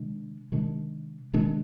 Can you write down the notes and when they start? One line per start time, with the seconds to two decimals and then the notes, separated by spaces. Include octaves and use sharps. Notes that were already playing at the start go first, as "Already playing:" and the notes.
Already playing: C3 D#3 G#3 D4
0.52 C3 D#3 G#3 D4
1.33 C3 D#3 G#3 D4